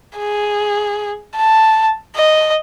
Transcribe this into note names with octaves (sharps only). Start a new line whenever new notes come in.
G#4
A5
D#5